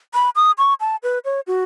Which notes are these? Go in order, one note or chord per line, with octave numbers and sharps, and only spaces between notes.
B5
D#6
C#6
A5
B4
C#5
F#4